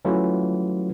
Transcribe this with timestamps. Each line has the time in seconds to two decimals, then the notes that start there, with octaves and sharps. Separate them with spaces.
0.05 E3 F#3 A3 C#4 F4